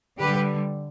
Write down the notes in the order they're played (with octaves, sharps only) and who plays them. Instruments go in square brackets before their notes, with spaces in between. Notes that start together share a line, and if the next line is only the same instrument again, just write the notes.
[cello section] D3 G3 G4 B4